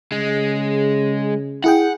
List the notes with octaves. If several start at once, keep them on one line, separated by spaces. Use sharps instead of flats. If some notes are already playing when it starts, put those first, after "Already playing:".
C#3 G#3
E4 G#4 F#5 G5